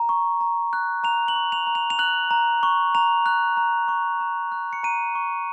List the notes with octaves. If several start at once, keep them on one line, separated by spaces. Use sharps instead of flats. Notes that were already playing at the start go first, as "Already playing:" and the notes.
Already playing: A#5
C#6
A#5
F#6
A#5 F7
F#7
C#6
F7
A#5
F7
F7
F#6 F#7
A#5
C#6
A#5 F7
F#6
A#5
C#6
A#5
F#6
C#7
A#5 D#7
C#6